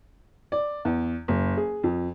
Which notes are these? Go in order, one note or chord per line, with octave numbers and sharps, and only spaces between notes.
D5
E2
F#1
G#4
F2